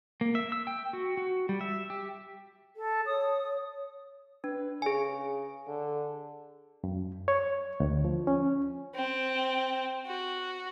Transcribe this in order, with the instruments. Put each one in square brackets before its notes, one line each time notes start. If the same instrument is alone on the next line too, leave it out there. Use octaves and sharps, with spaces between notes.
[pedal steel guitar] A#3
E5
E6
G5
F#4
F#4
G3
E5
G4
[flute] A4
[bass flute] C#5 [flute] D#6
[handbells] D4 [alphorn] B4
[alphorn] C#3 [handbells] G#4 G#5
[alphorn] D3
[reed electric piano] F#2
C#5
D2
F3
C#4
[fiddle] C4
F#4